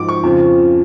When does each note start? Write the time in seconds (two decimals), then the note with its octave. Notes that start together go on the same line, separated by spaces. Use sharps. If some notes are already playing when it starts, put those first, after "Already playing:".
Already playing: G#2 F3 D6
0.09 C#6
0.23 F2 C#3 F3